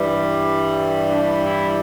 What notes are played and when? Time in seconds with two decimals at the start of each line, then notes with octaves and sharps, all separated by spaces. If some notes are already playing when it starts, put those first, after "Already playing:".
Already playing: G2 E3 G3
1.08 D4
1.46 E4